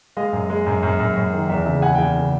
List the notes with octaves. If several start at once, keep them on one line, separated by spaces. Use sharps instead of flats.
G#3 D#5 F5
F#2
G#3
F#2
F#2
F#2
F#2
D#3
E2 E5
C#3 E5
E2 F#5 G#5
G5
E2 F#5 G#5
C#3